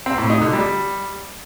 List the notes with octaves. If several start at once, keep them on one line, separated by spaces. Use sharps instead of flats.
C4
A2
D#4
D3
G3